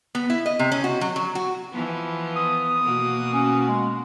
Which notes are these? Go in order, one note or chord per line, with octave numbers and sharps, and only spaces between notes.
B3
E4
D#5
C3
C#4
F#4
F#3
F#3
F#4
E3 F3 B3
D#6
B2 A#3 F#4
C#4
G#3